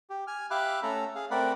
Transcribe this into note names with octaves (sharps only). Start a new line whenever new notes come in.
G4
G#5 F6
G4 E5 F5 B5 D6 F#6
A3 C#4 A4 A#5
G#4 F5
A3 C4 A#4 D5 F#5 B5